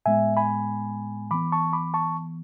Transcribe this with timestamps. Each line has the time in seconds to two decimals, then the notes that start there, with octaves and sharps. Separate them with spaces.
0.06 A2 G#3 B3 E5 G#5
0.37 G#5 B5
1.31 E3 B3 B5 D6
1.52 A5 C#6
1.73 B5 D6
1.94 A5 C#6